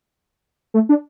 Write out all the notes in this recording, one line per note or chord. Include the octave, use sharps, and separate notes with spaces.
A3
D4